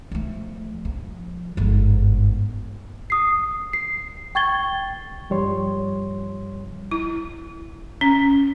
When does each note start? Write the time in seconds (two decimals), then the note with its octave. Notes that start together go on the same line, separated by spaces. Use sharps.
0.11 F3 A3
0.85 F3
1.57 G1 G#2
3.10 D#6 C7
3.73 C7
4.35 G5 C#6 G#6 A6 G7
5.30 G2 F3 G3 C#5 C6
6.91 E4
8.01 C#4